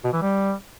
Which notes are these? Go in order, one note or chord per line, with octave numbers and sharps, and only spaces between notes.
B2
E3
G3